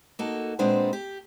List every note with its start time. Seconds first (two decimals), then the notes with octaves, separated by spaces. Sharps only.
0.19 A#3 D#4 F#4 A4
0.59 A#2 G#3 B3 C4 D4 C5
0.93 G4